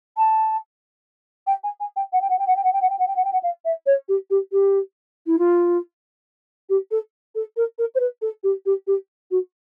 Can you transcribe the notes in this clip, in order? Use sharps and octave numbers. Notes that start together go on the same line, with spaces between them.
A5
G5
G#5
G#5
G5
F#5
G5
F#5
G5
F#5
G5
F#5
G5
F#5
G5
F#5
G5
F#5
G5
F#5
F5
E5
C#5
G4
G4
G4
E4
F4
G4
A4
A4
A#4
A#4
C5
B4
A4
G4
G4
G4
F#4